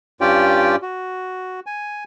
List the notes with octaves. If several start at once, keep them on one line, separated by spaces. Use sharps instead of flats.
G2 C#4 F4 G4 D5 G5
F#4
G#5